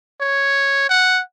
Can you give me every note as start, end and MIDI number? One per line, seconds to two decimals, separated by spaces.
0.21 0.85 73
0.89 1.21 78